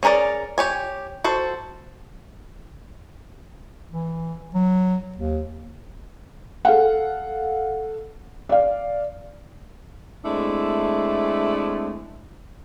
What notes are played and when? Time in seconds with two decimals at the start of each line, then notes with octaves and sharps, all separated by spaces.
0.03 C#4 G#4 A#4 B4 D5
0.58 G4 C#5 G#5
1.24 F#4 A4 C5
3.91 E3
4.54 F#3
5.16 D#2
6.65 A4 F5 F#5
8.49 D5 F5
10.24 G#3 A3 C4 D4 E4